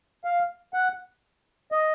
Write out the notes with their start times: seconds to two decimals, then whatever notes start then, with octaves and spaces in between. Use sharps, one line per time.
0.25 F5
0.74 F#5
1.72 D#5